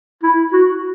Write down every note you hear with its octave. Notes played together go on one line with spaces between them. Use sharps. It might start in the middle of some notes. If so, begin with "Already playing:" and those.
E4
F#4